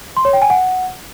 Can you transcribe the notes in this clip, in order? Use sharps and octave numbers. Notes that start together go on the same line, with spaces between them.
C6
C#5
G5
G#5
F#5